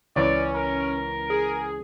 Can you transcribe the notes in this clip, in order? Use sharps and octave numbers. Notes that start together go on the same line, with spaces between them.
C#2 E3 C#4 D5
A#4
G#4